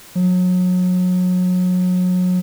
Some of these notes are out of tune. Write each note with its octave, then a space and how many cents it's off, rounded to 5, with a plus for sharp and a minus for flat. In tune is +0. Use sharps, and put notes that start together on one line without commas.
F#3 -30